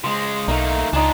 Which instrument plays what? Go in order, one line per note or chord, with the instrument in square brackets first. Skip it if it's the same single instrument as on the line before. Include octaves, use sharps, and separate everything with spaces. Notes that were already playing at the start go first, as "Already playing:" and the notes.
[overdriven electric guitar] C#3 G#3 [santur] C5
[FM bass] B1 [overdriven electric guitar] A3 A#3 [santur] D#4 E5 A#5
[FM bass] C#2 [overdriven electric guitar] D4 F4 [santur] D#4 G#5